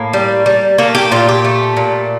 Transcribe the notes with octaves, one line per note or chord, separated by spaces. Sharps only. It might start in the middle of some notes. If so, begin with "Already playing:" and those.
Already playing: A2 A#3
G3
G3
A3 A#3
G4
A#2 F4
G4
A3
A#2